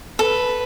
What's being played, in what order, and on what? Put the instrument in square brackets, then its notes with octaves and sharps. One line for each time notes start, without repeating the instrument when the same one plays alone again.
[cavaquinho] A4 [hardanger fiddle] B4